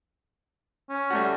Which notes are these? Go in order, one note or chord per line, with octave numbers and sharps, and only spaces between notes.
C#4
G3 A3 F#4